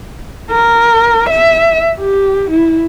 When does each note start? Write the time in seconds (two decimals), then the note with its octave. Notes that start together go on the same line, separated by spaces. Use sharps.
0.51 A#4
1.29 E5
2.00 G4
2.51 E4